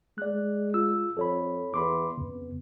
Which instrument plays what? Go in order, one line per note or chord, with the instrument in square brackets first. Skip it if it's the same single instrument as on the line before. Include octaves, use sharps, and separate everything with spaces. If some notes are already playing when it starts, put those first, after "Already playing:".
[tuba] G#3 [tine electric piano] D5 F#6
[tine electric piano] F4 E6
[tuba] F2 [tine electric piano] A4 C#5 B5
[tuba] E2 [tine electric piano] B5 C6 D6
[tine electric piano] F2 C#3 [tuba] B3